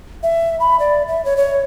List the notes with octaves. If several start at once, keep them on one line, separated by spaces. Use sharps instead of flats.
E5
B5
D5
E5
C#5
C#5